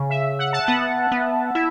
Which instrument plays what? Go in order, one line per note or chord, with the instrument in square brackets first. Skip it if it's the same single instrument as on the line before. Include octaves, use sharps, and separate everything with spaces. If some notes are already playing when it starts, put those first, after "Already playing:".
Already playing: [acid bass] C#3
[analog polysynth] E5
F#5
A5
[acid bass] B3 [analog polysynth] F#5
[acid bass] B3
[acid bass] E4 [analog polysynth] E5